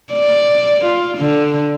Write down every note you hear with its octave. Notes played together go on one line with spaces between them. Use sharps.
D5
F4
D3